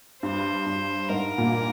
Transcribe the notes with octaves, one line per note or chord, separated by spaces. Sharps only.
G2 C5
G2
G#2 A#4
A#2